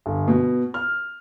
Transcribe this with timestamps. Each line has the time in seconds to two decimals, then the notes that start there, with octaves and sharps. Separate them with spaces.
0.06 G1
0.28 B2
0.74 F6